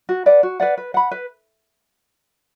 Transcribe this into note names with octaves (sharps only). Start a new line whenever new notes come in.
F#4
B4 D5 F#5
F#4
B4 D5 F#5
B4
F#5 B5
B4